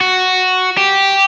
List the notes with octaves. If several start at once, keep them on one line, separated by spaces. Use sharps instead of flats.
F#4
G4